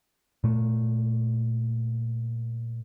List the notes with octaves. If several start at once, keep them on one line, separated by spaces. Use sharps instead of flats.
A#2 A3